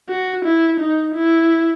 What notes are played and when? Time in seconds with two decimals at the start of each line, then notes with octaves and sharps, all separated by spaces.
0.09 F#4
0.45 E4
0.80 D#4
1.15 E4